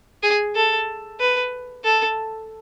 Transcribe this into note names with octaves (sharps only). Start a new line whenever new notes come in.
G#4
A4
B4
A4